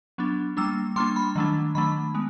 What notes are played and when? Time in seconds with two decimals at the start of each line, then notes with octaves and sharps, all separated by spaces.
0.18 F#3 B3 D4
0.57 G3 A#3 D4 E6
0.96 G3 A#3 D4 C6
1.16 B5
1.36 D#3 F#3 A3 D4
1.75 D#3 F#3 A3 D4 B5
2.15 G#3 B3